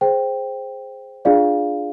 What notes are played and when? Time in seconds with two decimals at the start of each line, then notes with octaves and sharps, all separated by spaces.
0.01 G#4 C5 G5
1.25 D4 F4 G#4 D5 F5